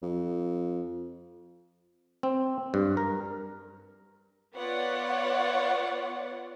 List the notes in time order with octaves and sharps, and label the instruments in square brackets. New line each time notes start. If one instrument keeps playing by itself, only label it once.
[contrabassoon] F2
[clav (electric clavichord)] C4
G2
A#4
[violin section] B3 F4 C#5 D5 F#5